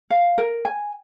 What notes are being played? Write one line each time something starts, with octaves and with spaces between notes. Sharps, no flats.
F5
A#4
G#5